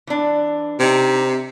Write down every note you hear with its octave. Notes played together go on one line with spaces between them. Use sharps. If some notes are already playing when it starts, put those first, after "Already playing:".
E3 D4
C3 D#4 G4